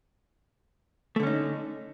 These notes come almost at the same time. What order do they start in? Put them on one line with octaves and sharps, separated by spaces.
A3 D3 C#4 D#4